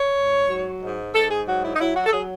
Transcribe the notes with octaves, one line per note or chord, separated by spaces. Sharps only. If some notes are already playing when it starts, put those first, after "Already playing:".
Already playing: C#5
G#2
F#3
G#2
G#2 A4
G#4
F#3 F#4
E4
D#4
F#3 E4
F#4
A4
F#3 G#4